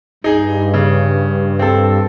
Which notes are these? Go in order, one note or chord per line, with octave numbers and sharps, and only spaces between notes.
G2 D#4 G#4
C#3
C4 A4